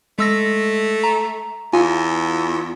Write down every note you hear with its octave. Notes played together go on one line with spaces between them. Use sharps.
G#3 A3 E6 A#6
A#5
E2 F4 G#5